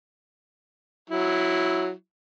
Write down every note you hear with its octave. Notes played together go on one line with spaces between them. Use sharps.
F#3 E4